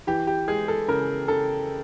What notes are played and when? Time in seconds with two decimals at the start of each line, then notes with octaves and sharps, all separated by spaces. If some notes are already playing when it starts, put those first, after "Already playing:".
0.07 E3 G4
0.27 G4
0.48 G#3 G#4
0.68 A4
0.88 C#3 A#4
1.28 C#3 A4